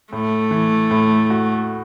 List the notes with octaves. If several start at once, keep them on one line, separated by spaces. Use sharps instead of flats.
A2 A3
E3
A2
F#4